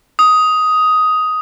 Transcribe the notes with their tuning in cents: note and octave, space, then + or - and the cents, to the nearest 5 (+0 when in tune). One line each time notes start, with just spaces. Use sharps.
D#6 +10